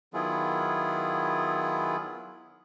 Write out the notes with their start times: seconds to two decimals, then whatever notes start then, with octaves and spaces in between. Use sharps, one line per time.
0.14 D#3 F#3 B3 E4 F4 G#4